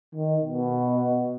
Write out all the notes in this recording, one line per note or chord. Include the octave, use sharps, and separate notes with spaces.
D#3
B2